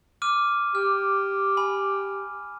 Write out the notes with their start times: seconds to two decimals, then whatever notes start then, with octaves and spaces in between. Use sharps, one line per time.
0.22 D6 F6 D#7
0.75 G4 F6
1.57 G#5 B5